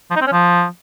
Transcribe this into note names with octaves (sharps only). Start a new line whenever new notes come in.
F3
D#4
C4
C#4
F3